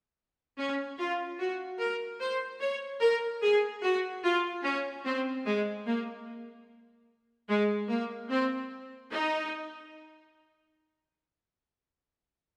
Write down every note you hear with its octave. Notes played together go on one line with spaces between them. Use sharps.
C#4
F4
F#4
A#4
C5
C#5
A#4
G#4
F#4
F4
C#4
C4
G#3
A#3
G#3
A#3
C4
D#4